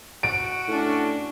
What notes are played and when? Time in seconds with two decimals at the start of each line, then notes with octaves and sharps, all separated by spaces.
0.23 F#4 D7
0.68 A2 C#4 D4